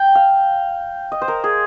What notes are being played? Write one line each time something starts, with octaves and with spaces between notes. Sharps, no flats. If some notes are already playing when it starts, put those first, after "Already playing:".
Already playing: G5
F5
D#5
C5
A#4
G#4